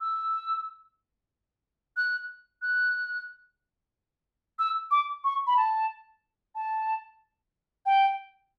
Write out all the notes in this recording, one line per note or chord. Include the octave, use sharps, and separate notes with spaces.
E6
F#6
F#6
E6
D6
C#6
B5
A5
A5
G5